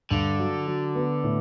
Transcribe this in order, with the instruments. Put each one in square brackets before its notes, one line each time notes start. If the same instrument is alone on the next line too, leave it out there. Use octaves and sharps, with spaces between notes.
[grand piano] G2 [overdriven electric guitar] D3
[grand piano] F#3
F#3
B3
A2